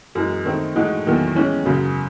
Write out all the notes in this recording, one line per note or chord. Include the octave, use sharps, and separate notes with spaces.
F#2 E3 G#3
D#3 A3 C4 D#4
A2 E3 G#3 D#4 F#4
E2 D#3 F#3 A3
E3 G#3 C#4
F#2 C#3 F#3